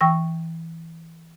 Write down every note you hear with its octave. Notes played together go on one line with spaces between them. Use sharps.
E3 G5 C#6 E6 A#6